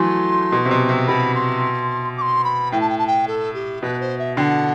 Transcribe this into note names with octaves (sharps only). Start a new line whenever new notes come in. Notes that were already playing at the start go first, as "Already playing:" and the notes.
Already playing: E3 F#3 A3 C6
B2
C3
B2
C3
B2 B5
C6
D6
C6
B5
A2 G5
A5
G5
A5
G5
A4
G4
B2 B4
C5
E5
D3 F#5 G5